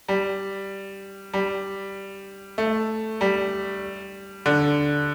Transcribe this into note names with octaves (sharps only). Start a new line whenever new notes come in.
G3
G3
A3
G3
D3